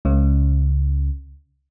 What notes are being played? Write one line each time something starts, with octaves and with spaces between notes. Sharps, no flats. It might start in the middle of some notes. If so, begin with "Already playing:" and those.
C#2 C#3